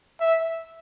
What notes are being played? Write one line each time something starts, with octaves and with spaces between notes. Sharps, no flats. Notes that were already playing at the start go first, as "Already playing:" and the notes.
E5